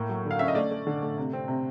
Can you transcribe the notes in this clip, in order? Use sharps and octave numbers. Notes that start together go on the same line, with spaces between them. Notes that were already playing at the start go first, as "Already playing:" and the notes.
Already playing: A2 A#3
F#3
D3
F5
C#4 E5
D#5
A3 D5
A3
D3
A3
C3
C4
C3